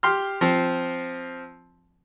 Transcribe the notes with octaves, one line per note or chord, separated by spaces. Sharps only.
G4 C6 F6
F3 C4